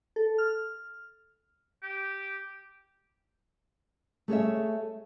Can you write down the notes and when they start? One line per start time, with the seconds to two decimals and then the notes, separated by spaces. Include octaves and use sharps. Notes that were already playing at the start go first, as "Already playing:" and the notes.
0.16 A4
0.38 F6
1.82 G4
4.28 A3 G#4 C#5 E5